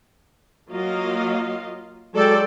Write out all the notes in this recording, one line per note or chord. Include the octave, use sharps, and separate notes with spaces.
F#3 A#3 F4 D#5 F5
F#3 G#3 A4 D5 G5